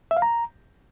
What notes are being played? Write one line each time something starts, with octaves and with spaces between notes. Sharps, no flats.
E5
F5
A#5